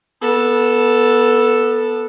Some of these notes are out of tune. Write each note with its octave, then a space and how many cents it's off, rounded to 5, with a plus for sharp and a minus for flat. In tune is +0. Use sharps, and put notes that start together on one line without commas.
B3 -20 A4 +0